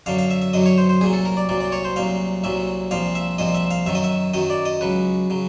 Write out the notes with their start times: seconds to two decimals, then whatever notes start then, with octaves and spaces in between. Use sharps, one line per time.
0.06 F#2 D3 F#3 F5
0.18 F5
0.30 E5
0.42 E5
0.53 F#2 D3 F#3 D#5
0.66 C#5
0.78 C5
0.89 C5
1.01 C2 A#2 F#3 G#4
1.13 A4
1.25 A#4
1.37 D5
1.49 C2 A#2 F#3 D5
1.61 D5
1.72 C#5
1.85 C5
1.96 C2 A#2 F#3 F5
2.44 C2 A#2 F#3 E5
2.91 C2 A#2 F3 F5
3.15 E5
3.38 C2 A#2 F3 D#5
3.55 E5
3.71 F5
3.86 F#2 D#3 F#3 E5
3.95 D#5
4.04 E5
4.34 F#2 D#3 F#3 D#5
4.50 D5
4.65 D#5
4.81 C#2 C#3 F#3 B4
5.30 C#3 F#3